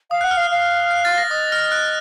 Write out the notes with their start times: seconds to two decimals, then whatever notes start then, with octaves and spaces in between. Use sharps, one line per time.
0.11 F5 D#6
0.21 F#5 F#6
0.31 F6
0.37 F5
0.51 F5
0.91 F#6
1.05 A6
1.18 A#6
1.31 D#5 D#6
1.52 F6
1.71 F#6